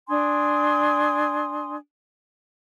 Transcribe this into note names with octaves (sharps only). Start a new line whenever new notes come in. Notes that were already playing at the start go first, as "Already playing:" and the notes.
D4 G#5 C6 D#6